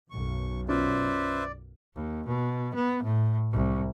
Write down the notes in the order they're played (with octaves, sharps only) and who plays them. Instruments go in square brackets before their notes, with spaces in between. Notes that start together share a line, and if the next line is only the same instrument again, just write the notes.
[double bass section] B1 F#2 [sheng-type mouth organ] C#6
[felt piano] C#4 F4 [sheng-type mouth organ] B4 C5 E5 [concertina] D5
[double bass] D#2
B2
B3
A2
C2